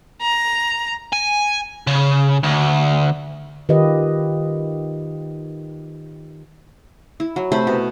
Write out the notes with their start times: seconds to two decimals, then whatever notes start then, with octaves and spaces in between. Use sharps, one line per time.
0.22 A#5
1.13 G#5
1.87 C#3
2.44 D2
3.69 D#3 F4 G4 B4 D#5
7.20 E4
7.36 F#3
7.52 C3 A3 C5 B5
7.67 B2